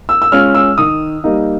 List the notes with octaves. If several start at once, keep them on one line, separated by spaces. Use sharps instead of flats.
E6
E6
G#3 C#4 F4 F6
E6
D#3 D#6
G3 A#3 D#4